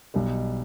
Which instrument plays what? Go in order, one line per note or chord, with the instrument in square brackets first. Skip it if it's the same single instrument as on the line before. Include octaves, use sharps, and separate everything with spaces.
[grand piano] B1 B2 G3